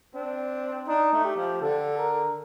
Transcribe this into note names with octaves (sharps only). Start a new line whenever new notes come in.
C4 D4
D4 D#4
A3
G4
F3
D3 A4
A#4